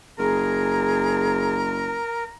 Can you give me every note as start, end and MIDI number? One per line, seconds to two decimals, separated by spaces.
0.19 2.01 30
0.19 1.57 68
0.19 2.24 70
0.19 2.37 82